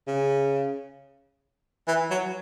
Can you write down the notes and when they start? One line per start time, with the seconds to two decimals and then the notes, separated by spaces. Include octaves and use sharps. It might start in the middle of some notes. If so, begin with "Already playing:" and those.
0.07 C#3
1.87 E3
2.10 F#3